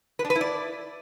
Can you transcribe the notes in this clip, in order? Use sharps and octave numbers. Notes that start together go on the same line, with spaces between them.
B4
D4
B4
E4
D5